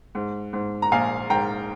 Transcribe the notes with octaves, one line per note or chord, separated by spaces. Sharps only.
G#2
G#2
A#5
A#1 F5 G#5
G#2 G5 A#5